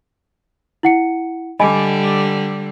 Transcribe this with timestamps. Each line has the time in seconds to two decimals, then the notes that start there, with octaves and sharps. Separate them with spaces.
0.83 E4 F#5 C#7
1.60 D3 G3 D#5 G#5 B5